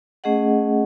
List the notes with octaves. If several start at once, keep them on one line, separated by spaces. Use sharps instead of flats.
A3 C#4 G#4 D#5 F#5